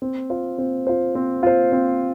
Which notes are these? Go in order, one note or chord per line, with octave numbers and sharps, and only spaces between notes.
C4
F4 C5
C4
F4 C5
C4
F4 C5
C4